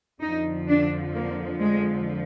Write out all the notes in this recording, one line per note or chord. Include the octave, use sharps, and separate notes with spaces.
F2 D3 F3 D#4
D4
A#3
G#3